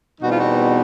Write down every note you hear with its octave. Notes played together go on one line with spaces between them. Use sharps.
E2 B2 G3 C4 D#4 F#4
F4
F#4